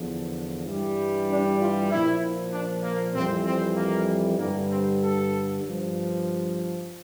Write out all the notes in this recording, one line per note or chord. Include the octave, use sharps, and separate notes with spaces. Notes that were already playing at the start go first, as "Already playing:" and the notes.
Already playing: E2 D3 F3
G2 E3 G3
D4
F4
A#2 F3 E4
D4
A#3
F2 E3 G3 C4
C4
A#3
G2 D3 G3 A#3
C4
A4
G2 F3